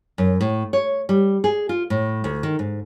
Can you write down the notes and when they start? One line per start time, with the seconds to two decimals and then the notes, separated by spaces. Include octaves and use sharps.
0.18 F#2
0.41 A2
0.73 C#5
1.09 G3
1.44 G#4
1.69 F4
1.90 A2
2.24 D2
2.43 D#3
2.59 G#2